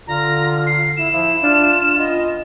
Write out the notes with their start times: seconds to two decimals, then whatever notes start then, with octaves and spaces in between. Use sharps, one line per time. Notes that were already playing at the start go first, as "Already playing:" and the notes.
0.07 D3 F4 A#5
0.67 C7
0.97 E4 E7
1.13 F3 E4
1.43 D4 F4
1.98 B3 C#4 F4 D#5